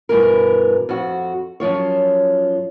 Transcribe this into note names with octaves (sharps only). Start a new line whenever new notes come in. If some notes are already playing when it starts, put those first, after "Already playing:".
G2 B2 E3 A#4
F2 F#4
F#2 F3 F4 C#5